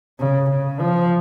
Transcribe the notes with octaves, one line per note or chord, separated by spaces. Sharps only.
C#3
C#3
F3